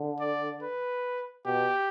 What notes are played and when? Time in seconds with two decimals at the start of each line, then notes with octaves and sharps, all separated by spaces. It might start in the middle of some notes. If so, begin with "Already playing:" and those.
Already playing: D3
0.20 D5
0.62 B4
1.46 B2 G4